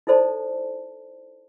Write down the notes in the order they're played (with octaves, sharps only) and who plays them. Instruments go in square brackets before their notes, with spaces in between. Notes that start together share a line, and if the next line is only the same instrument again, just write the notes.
[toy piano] D#4 E4 A4 C5 D5 A5